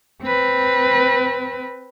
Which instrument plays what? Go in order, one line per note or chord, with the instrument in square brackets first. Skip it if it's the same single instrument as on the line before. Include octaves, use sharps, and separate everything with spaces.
[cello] C4 B4